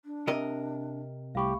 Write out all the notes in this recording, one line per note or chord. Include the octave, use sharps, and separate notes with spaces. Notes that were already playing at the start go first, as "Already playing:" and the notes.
D4
C3 A#4 D#5
C2 A3 G4 F5 B5 C#6